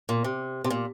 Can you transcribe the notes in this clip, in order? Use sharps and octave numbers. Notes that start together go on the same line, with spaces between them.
A#2
C3
C3
A#2